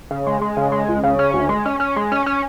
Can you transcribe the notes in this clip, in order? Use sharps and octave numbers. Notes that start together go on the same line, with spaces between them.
C#3
G#3
G#3
C#3
G#3
C#2
C#3
C#4
D2
G#3
C#4
C#4
G#3
C#4
C#4